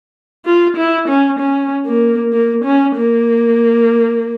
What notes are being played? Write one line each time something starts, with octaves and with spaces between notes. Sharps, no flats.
F4
E4
C#4
C#4
A#3
A#3
C#4
A#3